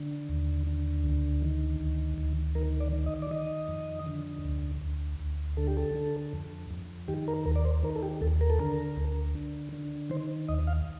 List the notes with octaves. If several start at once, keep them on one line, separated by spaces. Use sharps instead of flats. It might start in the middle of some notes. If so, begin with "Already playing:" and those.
Already playing: D3
D#2
D3
D2
D#3
D2
D2
D#3 A#4
D5
D#3
D#5
D5
D#3 D#5
F2
D3
D2
D2
D2
D3 A4
G4
A4
D3
F2
F2
D#3 G4
A#4
D#2 A#4
D5
C5
D#3 A#4
A4
G4
D#2 A4
A#4
A4
D3 A#4
D2
D3
D3
D#3 C5
D#2 D#5
F5